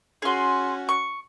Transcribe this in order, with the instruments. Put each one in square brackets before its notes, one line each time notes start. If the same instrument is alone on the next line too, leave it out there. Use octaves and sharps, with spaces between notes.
[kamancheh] C#4 F#4 [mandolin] G#4 C6
[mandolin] C#6